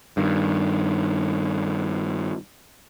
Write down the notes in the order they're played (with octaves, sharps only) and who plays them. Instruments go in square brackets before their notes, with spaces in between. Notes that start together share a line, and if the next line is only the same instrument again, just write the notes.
[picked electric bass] G2 D#3